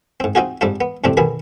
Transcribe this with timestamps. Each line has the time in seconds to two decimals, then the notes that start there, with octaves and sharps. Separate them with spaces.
0.20 G#2 C4
0.35 C4 D#4 F4 F#4 G#4
0.61 G#2 G3 C4 D4 F4
0.81 B3
1.04 F2 A2 C3 C4 D4
1.17 B1 B2 D#3 G#4 B5